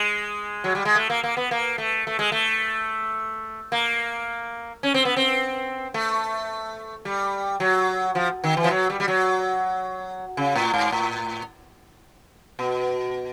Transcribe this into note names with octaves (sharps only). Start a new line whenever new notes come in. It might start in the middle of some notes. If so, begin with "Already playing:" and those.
Already playing: G#3
F#3
G3
G#3
A3
A#3
A#3
B3
A#3
A3
A3
G#3
A3
A#3
C#4
C4
B3
C4
A3
G3
F#3
F3
D#3
E3
F3
F#3
G3
G3
F#3
C#3
A2
G#2
A2
B2